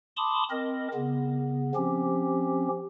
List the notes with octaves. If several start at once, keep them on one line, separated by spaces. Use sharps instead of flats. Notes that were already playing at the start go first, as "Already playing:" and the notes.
A5 B5 C6 D6 D#6
C4 A#4 D#5
C#3 B3
F3 C4 C#4 G4